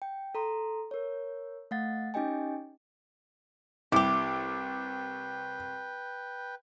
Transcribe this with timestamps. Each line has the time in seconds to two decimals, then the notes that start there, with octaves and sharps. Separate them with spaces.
0.02 G5
0.35 A4 A#5 C6
0.91 A#4 C#5
1.71 A3 F5 F#5 A6
2.14 C#4 D#4 G4 D#5 G5 G#5
3.92 C2 E4 G4 B4 G5 D6